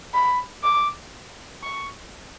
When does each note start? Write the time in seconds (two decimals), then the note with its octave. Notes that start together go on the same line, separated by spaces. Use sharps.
0.14 B5
0.63 D6
1.63 C#6